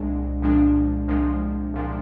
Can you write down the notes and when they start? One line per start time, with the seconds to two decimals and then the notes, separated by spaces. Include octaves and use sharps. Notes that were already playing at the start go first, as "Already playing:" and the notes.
Already playing: C2 A#2 G#3 D4
0.42 C2 A#2 F3 G#3 D4
1.07 C2 A#2 F3 G#3 D4
1.74 C2 A#2 F3 G#3 D4